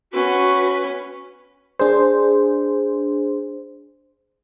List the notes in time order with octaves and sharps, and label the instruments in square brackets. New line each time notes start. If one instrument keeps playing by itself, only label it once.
[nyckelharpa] C#4 [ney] F#4 [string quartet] B4
[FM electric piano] D4 G#4 C5